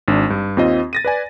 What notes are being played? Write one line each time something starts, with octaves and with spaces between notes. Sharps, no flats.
G#1 D4
G2
D#2 C4 F4 D#5
A6 A#6 D#7
B4 D5 G#5